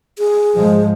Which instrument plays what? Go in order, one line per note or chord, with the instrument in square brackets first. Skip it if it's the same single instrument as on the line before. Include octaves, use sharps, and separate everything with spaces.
[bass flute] G#4
[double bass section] G#2 F3 G#3